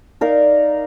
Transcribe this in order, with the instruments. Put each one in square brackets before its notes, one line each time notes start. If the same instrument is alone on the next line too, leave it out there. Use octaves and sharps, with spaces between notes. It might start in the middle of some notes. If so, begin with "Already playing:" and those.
[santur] D#4 A#4 D5 F5